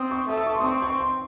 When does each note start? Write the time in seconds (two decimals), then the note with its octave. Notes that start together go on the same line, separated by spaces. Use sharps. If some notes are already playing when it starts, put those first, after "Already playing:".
Already playing: C4 D#6
0.11 C#6
0.29 A3 D#6
0.37 E6
0.46 C#6
0.55 C6
0.60 D#6
0.64 C4 C#6
0.82 C#6
1.01 C6